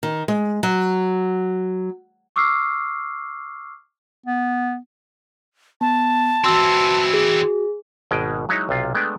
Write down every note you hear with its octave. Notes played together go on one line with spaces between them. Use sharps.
D#3
G#3
F#3
C#6 D6 E6 F6 C7
B3
B3 A5
E3 C4 F#4 C6 E6
G#4
G#1 B2 G#3 G5
F#3 G#3 D#4 E4 C#5
B1 C3 F4
G#3 A3 B3 D4 G5